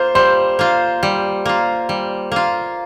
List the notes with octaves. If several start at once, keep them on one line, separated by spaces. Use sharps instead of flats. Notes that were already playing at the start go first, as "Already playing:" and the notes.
Already playing: A#3 F4 C5
G3 C5
A#3 F4
G3
A#3 F4
G3
A#3 F4